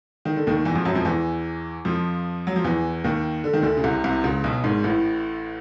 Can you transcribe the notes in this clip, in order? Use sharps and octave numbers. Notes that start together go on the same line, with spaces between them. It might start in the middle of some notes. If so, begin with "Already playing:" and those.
D#3
D3
D#2 D#3
E2 E3
F2 F3
F#2 F#3
F2 F3
E2 E3
F2 F3
F#3
F3
E2 E3
D#2 D#3
D3
D#3
D2 D3
C#3
C2 C3
C2 C3
C#2 C#3
B1 B2
G#1 G#2
A1 A2